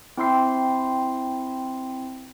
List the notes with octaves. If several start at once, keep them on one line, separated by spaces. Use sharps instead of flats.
C4 E4 G5 C6 E6 C7